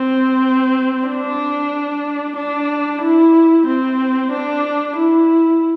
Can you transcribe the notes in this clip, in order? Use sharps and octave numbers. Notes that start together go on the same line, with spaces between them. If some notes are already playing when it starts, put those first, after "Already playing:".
Already playing: C4
D4
D4
E4
C4
D4
E4